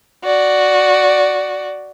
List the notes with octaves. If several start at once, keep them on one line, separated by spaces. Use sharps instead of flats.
F#4 D5